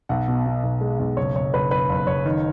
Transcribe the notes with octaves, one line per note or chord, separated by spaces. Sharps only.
B1 F#5
B2
B2
B1
G#3
B1
F#1 C#5
F#1 C#5
F#1 B4
F#1 B4
F#1
F#1 C#5
D#3